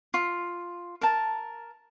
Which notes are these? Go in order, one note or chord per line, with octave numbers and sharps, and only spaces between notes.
F4
A#4 A5